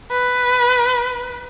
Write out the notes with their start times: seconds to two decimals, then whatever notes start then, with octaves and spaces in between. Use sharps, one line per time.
0.11 B4